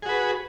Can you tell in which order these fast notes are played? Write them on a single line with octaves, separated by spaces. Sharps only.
G#4 F#4 B4